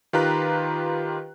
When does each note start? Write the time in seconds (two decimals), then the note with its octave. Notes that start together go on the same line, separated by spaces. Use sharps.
0.13 D#3 F4 G4 B4 A#5 F#6